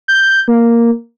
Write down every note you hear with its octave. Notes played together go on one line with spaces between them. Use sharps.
G6
A#3